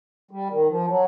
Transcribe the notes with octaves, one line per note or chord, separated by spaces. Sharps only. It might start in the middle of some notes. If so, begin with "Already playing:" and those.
G3
D#3
F3
F#3